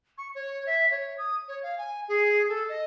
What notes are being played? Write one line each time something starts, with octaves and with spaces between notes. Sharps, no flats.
C#6
C#5
E5
C#5
D#6
C#5
F5
G#5
G#4
A4
D#5